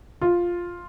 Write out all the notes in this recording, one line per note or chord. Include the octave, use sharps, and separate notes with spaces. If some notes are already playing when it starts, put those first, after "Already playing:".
F4